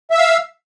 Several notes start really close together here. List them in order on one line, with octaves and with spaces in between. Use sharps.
E5 E6 F5